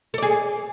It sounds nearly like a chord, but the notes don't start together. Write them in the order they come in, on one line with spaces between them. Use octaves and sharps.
A4 D5 G#4